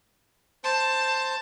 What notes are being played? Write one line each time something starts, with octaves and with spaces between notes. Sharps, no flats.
C5 A5